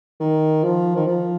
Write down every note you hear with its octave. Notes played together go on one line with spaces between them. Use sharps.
D#3
F3
D#3
F3